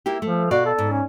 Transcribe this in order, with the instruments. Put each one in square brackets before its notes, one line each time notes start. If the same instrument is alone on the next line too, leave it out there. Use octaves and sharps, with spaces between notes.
[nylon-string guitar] A#3 E4 G4
[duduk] F3 [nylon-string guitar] A3
[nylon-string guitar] B2 D5 F5 [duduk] F#4
[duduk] A4
[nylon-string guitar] G#2
[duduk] C#4